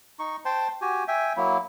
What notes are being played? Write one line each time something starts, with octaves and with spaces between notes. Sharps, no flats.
D#4 C#6
C5 G5 A5 C6
F#4 G4 G#5
E5 G5 G#5
F#3 A#3 E4